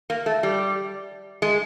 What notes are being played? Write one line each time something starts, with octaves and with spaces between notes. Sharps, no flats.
A#3
A3
G3
G#3